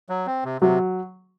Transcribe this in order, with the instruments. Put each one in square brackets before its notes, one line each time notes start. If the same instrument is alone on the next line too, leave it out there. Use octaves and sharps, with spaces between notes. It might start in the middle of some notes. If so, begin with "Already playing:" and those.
[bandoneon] F#3
C4
C3
[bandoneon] C3 [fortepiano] F#3